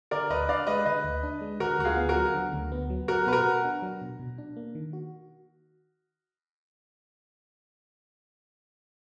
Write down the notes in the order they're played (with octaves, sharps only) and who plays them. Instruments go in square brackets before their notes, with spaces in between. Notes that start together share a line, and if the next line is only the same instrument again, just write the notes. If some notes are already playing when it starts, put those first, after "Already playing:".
[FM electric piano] D3 [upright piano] A#4 D5
[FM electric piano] D2 [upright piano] B4 D#5
[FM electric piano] D4 [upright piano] D5 F5
[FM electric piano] G#3 [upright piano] B4 D#5
[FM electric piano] D3 [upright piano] B4 D#5
[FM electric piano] D2
D4
G#3
[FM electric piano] D3 [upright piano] F#4 A#4
[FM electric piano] D2 [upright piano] F#4
[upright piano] F4 G#4
[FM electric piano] B3
[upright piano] F#4 A#4
[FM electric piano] F#3
D3
D2
B3
F#3
[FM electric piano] F#3 [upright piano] F#4 A#4
[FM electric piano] B2 [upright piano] B4
[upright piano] F#4 A#4
[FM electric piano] B2
D4
F#3
B2
B2
D4
A#3
D#3
F#4